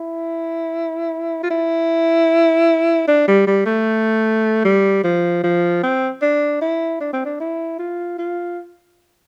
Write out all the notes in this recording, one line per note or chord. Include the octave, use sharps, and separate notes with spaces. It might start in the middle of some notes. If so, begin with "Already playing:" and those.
Already playing: E4
F4
E4
D4
G3
G3
A3
G3
F3
F3
C4
D4
E4
D4
C4
D4
E4
F4
F4